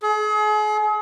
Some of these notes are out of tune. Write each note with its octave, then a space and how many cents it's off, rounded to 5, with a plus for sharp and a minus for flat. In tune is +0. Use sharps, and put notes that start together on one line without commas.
G#4 +40